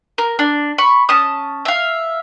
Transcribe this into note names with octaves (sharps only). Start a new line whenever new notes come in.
A#4
D4
B5 C#6
C#4 A5 D#6
E5 F5